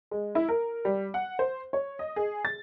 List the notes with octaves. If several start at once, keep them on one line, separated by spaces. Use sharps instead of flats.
G#3
E4
A#4
G3
F#5
C5
C#5
D#5
G#4
A6